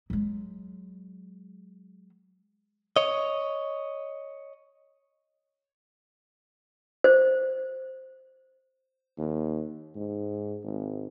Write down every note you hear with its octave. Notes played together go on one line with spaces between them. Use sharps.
F#3 G#3
C#5 D#5
C5
D#2
G#2
G#1